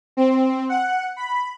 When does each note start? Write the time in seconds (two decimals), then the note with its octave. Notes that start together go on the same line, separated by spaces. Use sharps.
0.17 C4
0.69 F#5
1.16 B5